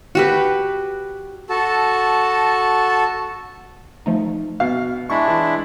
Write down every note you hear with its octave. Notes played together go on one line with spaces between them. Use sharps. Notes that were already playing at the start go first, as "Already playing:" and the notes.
F#4 G4 B4
F#4 A4 A5
F3 A3 D#4
B2 F5
G#3 D4 E4 B5 C#6
E3